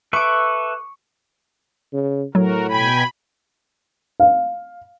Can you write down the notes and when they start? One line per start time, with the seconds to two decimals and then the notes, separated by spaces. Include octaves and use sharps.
0.13 A4 B4 E5 C#6 D6
1.93 C#3
2.35 A2 F#3 F#4 A#4
2.71 B2 G5 G#5 B5
4.20 F5